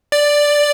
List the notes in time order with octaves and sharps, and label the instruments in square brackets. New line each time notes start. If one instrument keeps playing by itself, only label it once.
[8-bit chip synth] D5